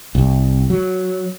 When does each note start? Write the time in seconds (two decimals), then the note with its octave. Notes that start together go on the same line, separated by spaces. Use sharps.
0.15 C2
0.70 F#3